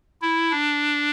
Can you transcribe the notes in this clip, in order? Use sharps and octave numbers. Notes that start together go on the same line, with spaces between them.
E4
D4